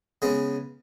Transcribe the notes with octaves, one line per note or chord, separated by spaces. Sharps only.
C#3 G#3 B3